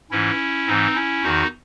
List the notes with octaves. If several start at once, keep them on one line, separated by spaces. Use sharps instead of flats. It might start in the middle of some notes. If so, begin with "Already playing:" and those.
G#2 E3 C#4 E4
G#2 E3 C4 D#4
C#4 E4
E2 D#3 D#4 F#4